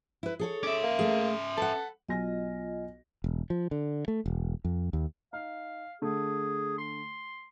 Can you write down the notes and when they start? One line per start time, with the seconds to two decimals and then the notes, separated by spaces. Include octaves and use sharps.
0.23 E4 B4
0.39 G#4 A4 C#5
0.63 C#4 E5 D6
0.83 A#3
0.99 A3 G#4
1.57 A4 B4 F#5
2.09 B1 F4 D#5 G#5 A#6
3.24 E1
3.50 F3
3.71 D3
4.08 A3
4.26 E1
4.65 F2
4.93 D#2
5.33 D#4 F5
6.02 D3 A3 G#4
6.78 C6